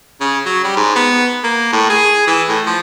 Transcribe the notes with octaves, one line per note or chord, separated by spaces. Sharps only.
C#3
F#3
G3
G#2
B3
A#3
A2
G#4
E3
A2
F3